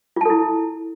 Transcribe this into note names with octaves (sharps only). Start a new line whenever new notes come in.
E4 F4 A4 A5